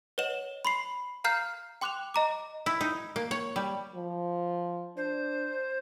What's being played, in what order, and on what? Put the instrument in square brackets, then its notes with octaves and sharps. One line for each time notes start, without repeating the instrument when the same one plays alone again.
[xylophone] B4 C#5 D#5 F#5 E7 F#7
B5 C6 C7
F5 A#5 F6 G6 C7
G5 C6 D6 F#6 E7 F7
D#5 A#5 D6
[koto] E4
D#4
A#3
C#5
G3
[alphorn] F3
[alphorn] D4 [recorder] C5